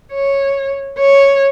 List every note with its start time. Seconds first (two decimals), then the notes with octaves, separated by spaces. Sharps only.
0.13 C#5
0.99 C#5